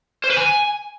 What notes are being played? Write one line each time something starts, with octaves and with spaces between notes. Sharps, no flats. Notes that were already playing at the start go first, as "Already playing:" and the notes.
C5
B4
G#5